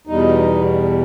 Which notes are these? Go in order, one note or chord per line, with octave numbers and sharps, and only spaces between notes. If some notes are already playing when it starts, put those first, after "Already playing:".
E2 B2 G3 D#4